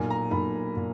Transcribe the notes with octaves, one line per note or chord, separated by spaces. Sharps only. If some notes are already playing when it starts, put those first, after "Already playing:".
Already playing: B1 A#2 G#5
A#5
B1 A#2 B5
A#2